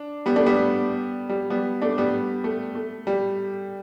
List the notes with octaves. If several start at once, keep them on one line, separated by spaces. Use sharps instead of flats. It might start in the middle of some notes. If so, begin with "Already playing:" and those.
Already playing: D4
G3 B3
A3 D4
G3 B3
G3
G3 B3
A3 D4
G3 B3
A3
A3
G3